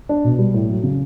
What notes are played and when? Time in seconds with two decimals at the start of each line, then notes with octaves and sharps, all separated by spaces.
0.09 D4
0.24 B2
0.39 G3
0.54 A2
0.69 F#3
0.84 C#3